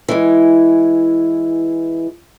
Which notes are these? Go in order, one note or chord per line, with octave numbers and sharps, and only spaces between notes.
E3 G#3